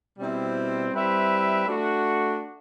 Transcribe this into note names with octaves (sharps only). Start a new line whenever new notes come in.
B2 G3 C4 E4
G3 C4 E4 B4 E5
A3 D4 F#4